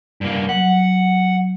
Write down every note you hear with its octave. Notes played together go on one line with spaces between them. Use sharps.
G2 A#3
F#3 F#5